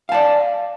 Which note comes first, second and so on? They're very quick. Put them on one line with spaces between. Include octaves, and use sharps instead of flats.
F5 A5 D5